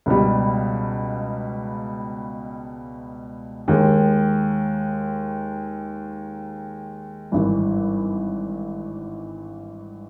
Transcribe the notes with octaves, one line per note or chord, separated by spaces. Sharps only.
C#2 B2 G3
D#2 D#3 G#3
G#1 G2 E3 G3